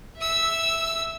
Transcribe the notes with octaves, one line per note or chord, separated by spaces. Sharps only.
E5 E6